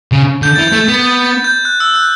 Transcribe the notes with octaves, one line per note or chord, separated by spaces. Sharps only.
C#3
D3 G6
E3 A6
A3 G6
B3
A6
A6
G6
F#6
E6
F#6